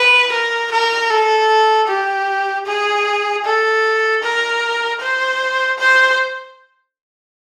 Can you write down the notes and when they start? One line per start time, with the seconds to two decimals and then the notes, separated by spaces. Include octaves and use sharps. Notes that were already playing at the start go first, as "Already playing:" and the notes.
Already playing: B4
0.32 A#4
0.72 A#4
1.10 A4
1.88 G4
2.66 G#4
3.44 A4
4.22 A#4
5.01 C5
5.78 C5